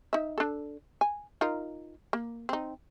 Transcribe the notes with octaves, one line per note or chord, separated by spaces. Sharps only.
D#4 E5
D4 A4
G#5
D#4 F4 A#4
A#3
C4 D#4